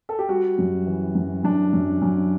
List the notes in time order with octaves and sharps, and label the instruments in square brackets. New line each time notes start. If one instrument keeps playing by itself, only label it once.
[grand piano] A4
G4
G3 F#4
F#2
E3
F#2
F#2 D4
F#2
F#2